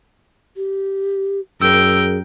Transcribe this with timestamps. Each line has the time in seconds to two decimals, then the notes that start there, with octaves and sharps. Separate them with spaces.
0.57 G4
1.62 F#2 G#4 A#4 G5 E6